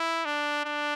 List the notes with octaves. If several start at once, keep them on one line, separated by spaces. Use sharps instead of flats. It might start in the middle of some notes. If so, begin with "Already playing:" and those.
Already playing: E4
D4
D4